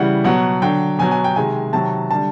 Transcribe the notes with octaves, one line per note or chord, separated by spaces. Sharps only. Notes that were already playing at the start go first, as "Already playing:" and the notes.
Already playing: C#3 E3 G3 F#5
B2 F#3 F#5
D3 F#3 G5
B2 F#3 G#5
G#5
G5
C3 D#3 G#3 G#5
C3 D#3 F#3 A5
D3 G3 A5